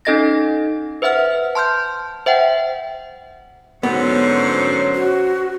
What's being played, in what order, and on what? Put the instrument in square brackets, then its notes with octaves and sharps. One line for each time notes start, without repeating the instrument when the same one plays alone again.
[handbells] C#4 D#4 A4 D#5 A6 A#6
B4 C5 E5 F#5 F6
A5 C6 F6 G6
C5 E5 F#5 G5
[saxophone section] G#2 D3 F#3 [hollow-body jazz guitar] B3 [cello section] C#4 C5 C#5
[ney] F#4